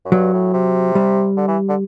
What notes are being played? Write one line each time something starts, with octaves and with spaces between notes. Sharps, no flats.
F#2
G2 F#3
A2
C3
G3
D3
E3
D3